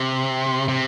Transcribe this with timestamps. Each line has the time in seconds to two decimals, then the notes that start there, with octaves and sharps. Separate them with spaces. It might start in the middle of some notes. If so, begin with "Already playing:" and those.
Already playing: C3
0.68 C3